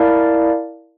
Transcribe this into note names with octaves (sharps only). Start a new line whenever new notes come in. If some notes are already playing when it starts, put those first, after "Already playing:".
Already playing: E4 A#4 D5 F5 A5